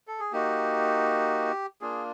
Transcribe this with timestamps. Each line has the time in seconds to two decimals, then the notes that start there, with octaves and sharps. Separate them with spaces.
0.08 A4
0.20 G#4
0.32 A#3 D#4 F#4 G4
1.81 A#3 D4 F4 G#4